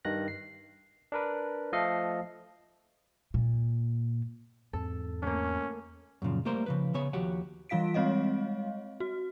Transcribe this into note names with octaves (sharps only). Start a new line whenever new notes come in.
G2 D#3 F#6 A#6
C7
D4 A#4 B4
F3 A3 A4 D#5 F5 C7
A#2
E2 G#2 C4 A4
A3 A#3 C#4
F#2 A#2 C#3 F3
G3 A3 A#3 A#4 C5 C6
C#3 F3 B4
C#3 B3 C#5
D#2 F3 F#4 G4 C#5 F#5
E3 G3 F4 F5 B6 D7
G3 G#3 C4 C#5 D#5 F5
F#4